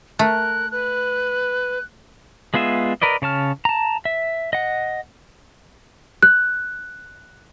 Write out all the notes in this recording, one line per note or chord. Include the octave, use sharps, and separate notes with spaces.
A3 A#4 F#6
B4 F#6
G#3 B3 F4 G#4 E5
A#4 B4 D5 D#5
C#3 C#5 A5 F6
A5 A#5
E5
D#5 F#5
F#6